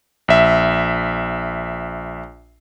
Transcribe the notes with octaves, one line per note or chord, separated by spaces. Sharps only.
A#1 E5